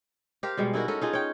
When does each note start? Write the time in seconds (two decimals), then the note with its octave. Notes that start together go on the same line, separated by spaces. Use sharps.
0.43 G4 A#4 C5 F5
0.57 B2 G3 G#3
0.73 D#4 E4 F#4 A#4
0.88 C#4 A4 A#4
1.01 D#4 F4 G#4
1.13 C#5 G5